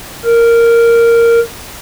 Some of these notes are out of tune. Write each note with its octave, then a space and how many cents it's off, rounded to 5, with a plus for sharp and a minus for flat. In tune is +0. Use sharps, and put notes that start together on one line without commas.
A#4 -5